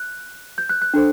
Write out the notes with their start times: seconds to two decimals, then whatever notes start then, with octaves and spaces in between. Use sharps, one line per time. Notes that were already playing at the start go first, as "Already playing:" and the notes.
Already playing: F#6
0.58 G6
0.69 F#6
0.82 F#6
0.94 D4 A4 C5